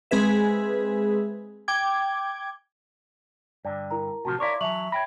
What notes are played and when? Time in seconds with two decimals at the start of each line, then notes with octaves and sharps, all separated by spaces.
0.11 G#3 C4 G#4 B4 E5
1.68 G5 D6 G#6
3.65 G2 D3 D5
3.91 E4 A#4 A#5
4.25 A2 C3 F3 F#4 A5
4.40 E4 A#4 C#5 D5 F5 C6 D6
4.61 E3 F#3 E5 A5 F7 F#7
4.92 C#5 G5 B5 A#6